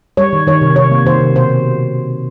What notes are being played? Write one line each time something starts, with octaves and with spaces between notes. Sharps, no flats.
G3 C#5
D#3
D#3 C#5
C3
C3 C#5
A#3
D#3 C5
C3
B2 C5